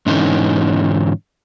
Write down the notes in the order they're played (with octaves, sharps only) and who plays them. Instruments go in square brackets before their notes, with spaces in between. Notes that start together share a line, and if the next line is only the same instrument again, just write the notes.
[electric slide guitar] G#2 D3 E3 C#4 D#4